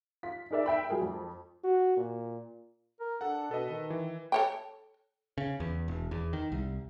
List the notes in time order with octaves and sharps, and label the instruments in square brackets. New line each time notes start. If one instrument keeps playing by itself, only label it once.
[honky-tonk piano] F4 B6
D#4 G#4 A#4 D5 E5
E5 G5 B5
F#3 G#3 G#4 A#4
F2
[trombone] F#4
A#2
[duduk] A#4
[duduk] D4 [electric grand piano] A4 F#5
[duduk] B2 [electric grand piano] A4 B4 D#5
[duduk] D#3
[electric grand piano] E3
[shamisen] A4 C#5 G5
[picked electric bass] C#3
E2
E1
E2
D#3
C2